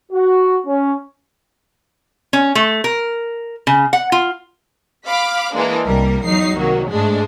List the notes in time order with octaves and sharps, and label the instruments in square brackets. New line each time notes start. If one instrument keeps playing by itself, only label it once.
[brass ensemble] F#4
C#4
[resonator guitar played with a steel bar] C#4
A3
A#4
C#3
F#5
F4
[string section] F5 B5 D6 F6
E3 G#3 A#3 D4
C2 G3 A#3 A#4
E2 F#3 D#4 C7
C2 D#3 F#3 A#3
G#2 G#3 A3 D4